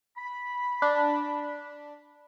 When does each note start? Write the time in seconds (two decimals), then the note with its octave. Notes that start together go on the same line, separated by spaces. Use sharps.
0.17 B5
0.82 D4